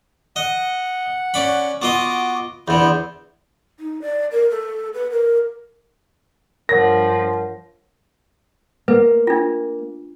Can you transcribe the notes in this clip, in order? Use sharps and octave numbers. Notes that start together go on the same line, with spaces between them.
D#5 F#5
C#4 D5 B5
B3 F4 F#4 D#5 D6
E2 D3 B3 E4 C5
D#4
D5
A#4
A4
B4
A#4
G2 F3 A#4 C#5 F#5 A#6
A#3 B4
D4 F4